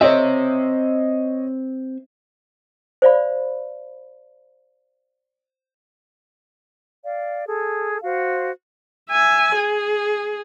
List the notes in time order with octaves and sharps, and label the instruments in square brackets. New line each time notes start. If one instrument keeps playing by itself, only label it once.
[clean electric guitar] C4 E5 [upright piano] C#5 D#5
[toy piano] C5 D5 F5 B5
[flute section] D5 F5
G#4 A4
F#4 C5 F5
[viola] E5 G#5
G#4